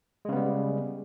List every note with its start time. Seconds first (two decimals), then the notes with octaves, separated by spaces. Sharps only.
0.25 G#3
0.29 C#3
0.33 B3
0.36 G3